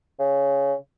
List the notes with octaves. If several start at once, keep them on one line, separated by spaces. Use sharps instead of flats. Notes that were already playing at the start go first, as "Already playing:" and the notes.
C#3